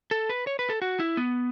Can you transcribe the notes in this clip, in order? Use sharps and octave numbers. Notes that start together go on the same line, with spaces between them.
A4
B4
C#5
B4
A4
F#4
E4
B3